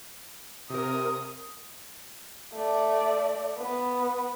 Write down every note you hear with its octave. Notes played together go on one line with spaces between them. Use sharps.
C3 A#4 D#6
A3 D5
B3